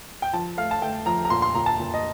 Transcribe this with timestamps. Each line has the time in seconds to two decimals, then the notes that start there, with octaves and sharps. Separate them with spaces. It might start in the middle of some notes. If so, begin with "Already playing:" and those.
0.22 G5
0.33 F3 A5
0.57 A3 F5
0.71 A5
0.82 A3 G5
1.06 F3 A#5
1.25 A#5
1.30 A#2 C6
1.42 C6
1.55 A#2 A#5
1.66 A5
1.79 A#2
1.94 D#5